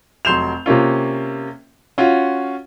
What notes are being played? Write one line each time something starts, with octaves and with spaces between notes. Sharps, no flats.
F1 F#3 C6 G6 E7 F7
C3 A#3 C#4 F4
C#4 F4 F#4